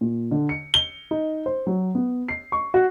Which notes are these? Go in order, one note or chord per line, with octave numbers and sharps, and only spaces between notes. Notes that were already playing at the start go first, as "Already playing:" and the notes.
A#2
D3
C#7
G7
D#4
C5
F#3
B3
C7
C#6
F#4